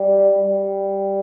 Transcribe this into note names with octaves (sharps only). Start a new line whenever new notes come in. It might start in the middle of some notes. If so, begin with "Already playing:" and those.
Already playing: G3
G3